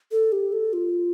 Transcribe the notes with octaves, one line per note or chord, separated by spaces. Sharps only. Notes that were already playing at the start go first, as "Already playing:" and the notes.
A4
G4
A4
F4